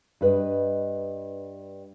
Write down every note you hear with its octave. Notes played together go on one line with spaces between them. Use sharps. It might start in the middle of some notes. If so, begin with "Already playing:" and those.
G2 B4 D#5